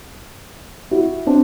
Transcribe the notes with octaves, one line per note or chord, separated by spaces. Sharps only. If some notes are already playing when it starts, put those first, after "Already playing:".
E4 F#4
C4 D4